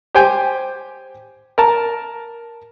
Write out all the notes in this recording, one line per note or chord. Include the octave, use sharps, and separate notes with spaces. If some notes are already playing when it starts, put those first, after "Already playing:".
G4 C5 G5 G#5
A#4 A5